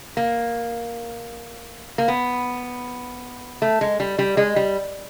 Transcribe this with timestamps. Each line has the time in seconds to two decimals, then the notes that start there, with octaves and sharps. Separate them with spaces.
0.17 A#3
1.98 A#3
2.08 B3
3.62 A3
3.81 G#3
4.00 G3
4.19 G3
4.37 G#3
4.56 G3